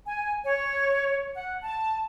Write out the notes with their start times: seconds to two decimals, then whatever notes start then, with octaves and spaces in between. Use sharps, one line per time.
0.06 G#5
0.44 C#5
1.34 F#5
1.63 A5